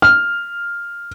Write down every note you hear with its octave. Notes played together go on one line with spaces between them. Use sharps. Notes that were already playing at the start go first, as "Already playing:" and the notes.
F6